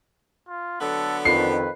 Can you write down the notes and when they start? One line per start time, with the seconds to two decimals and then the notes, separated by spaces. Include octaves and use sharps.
0.48 F4
0.81 D3 F#3 B3 A4
1.25 F2 D#3 B4 C7